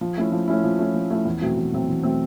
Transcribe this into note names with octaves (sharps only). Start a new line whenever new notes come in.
F3
A3 C#4 E4
F3
A3 C#4 E4
F3
A3 C#4 E4
F3
A3 C#4 E4
E2
B2 F#3 A3 C4
E2
B2 F#3 A3 C4
E2
B2 F#3 A3 C4